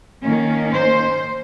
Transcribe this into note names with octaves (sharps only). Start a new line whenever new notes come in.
D#3 A#3 C#4
C5